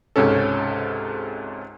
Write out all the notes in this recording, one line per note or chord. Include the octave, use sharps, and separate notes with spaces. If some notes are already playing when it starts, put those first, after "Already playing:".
C#2 G#2 C3 C#4 A4